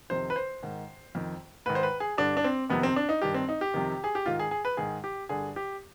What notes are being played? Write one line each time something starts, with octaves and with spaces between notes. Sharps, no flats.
F2 C3 D#3 C5
B4
C5
G#2 D#3
F2 D#3
G#2 D#3 B4
C5
B4
G#4
G2 D3 D4
D4
C4
F2 C3 D#3 B3
C4
D4
D#4
G2 D#3 G4
C4
D#4
G4
F2 C3 D#3
G#4
G4
G#2 D#3 F4
G#4
G#4
B4
G#2 D#3 G#4
G4
G2 D3 G#4
G4